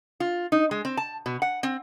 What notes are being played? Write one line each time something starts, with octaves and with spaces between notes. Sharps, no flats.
F4
D#4
G#3
C4
A5
B2
F#5
C4